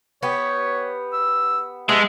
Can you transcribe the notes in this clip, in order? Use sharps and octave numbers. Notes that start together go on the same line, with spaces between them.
B3 G4 C#5
E6
G#3 B3 G4 A4 E5